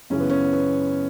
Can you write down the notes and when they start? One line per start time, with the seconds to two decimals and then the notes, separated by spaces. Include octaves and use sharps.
0.10 F#2 C#3 E3 C#4
0.20 B3
0.30 C#4
0.53 B3